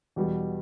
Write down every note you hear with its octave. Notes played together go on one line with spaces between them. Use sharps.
E2 B2 G3